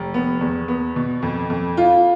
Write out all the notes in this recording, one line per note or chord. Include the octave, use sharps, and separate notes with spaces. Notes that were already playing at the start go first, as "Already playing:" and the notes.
Already playing: F1
B3
E2
B3
B2
F2
F2
F4